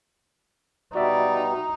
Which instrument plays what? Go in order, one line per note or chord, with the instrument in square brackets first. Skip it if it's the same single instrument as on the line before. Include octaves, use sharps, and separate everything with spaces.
[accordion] B2 G3 B3 [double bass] D#4 [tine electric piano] F#4 E5 [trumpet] D5